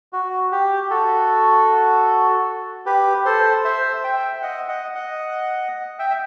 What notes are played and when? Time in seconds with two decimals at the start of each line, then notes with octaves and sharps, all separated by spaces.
0.13 F#4
0.52 G4
0.90 F#4 A4
2.86 G4 B4
3.25 A4 C5
3.65 C5 E5
4.04 E5 G5
4.42 D#5 F#5
4.68 D#5 F#5
4.95 D#5 F#5
5.99 E5 G5
6.10 E5